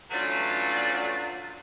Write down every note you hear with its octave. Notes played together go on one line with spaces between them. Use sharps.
E3 F#3 A3 C#4 D4 F4